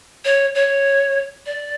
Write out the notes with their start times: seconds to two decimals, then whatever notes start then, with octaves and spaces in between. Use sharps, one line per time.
0.25 C#5
0.55 C#5
1.46 D5